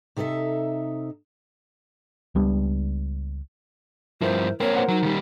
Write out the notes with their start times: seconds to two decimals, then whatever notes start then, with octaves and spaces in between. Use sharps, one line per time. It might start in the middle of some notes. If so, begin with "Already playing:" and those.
0.17 C3 D#4 A4 D5 E5
2.35 C#2 G3 B3 D4
4.21 G2 F3 E4 A#4 C5
4.60 A#3 C4 A#4 C#5
4.75 A#4 C5 F#5
4.88 F#3 D#4
5.02 D#2 G3